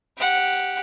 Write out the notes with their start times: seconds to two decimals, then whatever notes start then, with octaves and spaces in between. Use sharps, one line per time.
0.18 G4 F#5